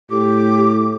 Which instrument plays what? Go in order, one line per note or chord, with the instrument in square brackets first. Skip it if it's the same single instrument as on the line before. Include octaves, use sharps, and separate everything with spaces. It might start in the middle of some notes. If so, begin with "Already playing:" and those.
[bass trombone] A2 [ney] G4 [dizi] D6